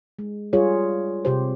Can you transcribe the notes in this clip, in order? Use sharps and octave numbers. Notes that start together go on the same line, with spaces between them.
G#3
G3 F4 G#4 C#5
C3 G4 C5